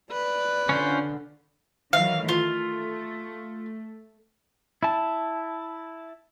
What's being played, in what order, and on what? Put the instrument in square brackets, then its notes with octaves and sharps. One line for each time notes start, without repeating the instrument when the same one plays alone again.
[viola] B4 [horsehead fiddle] D5
[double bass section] D3 [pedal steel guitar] C#4 F4 C5
[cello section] D#3 E3 F#3 [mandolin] F5
[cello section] A3 [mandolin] F4
[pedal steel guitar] E4 A5